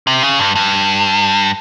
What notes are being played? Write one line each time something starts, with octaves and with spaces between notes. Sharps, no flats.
C3
C#3
G2
G2